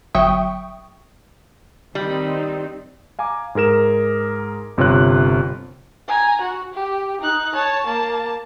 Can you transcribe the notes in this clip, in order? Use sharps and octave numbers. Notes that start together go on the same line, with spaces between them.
G1 F#3 E5 G5 C#6 D#6
D#3 G3 C4 D#4
F5 G#5 A#5 D6
G#2 G#4 A#4 E7
G1 C3 F4 C#5 F#6
G#5 A#5
F#4
G4
D#4 F#6
C#5 A5
A#3 A5